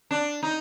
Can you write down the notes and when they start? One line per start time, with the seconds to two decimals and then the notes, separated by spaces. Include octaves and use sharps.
0.11 D4
0.43 D#4